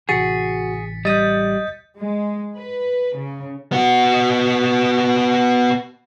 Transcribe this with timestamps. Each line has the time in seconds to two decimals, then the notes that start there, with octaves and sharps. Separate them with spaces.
0.09 A1 C3 E3 F#4 G#4 A6 B6 C#7
1.05 G3 D#5 D#6 G6 A6
1.96 G#3
2.56 B4
3.17 C#3
3.72 B3 F#4